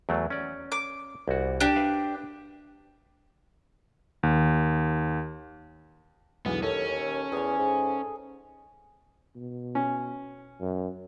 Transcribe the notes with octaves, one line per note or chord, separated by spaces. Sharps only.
E2 F#3 A3
C#4 D5
D6
C2 F#4
D4 G4
B4 E5 F5
D#2
B1 E2 D3 B3
D#2 C#4 A4
E2 G#4 G#5
G#2
B2
C#4
F#2